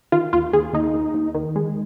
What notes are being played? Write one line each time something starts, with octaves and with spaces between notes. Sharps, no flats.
D#3 F4
D#2 F4
D#2 G#4
D#2 D#4
D#2
D#2
D#3
G#3